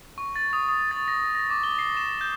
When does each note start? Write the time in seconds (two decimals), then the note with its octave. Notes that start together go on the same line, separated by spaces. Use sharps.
0.18 C#6
0.36 A6
0.53 D#6
0.69 D#6
0.91 A6
1.08 A#6
1.35 A#6
1.50 D6
1.63 G7
1.79 C7
1.97 E7
2.21 G6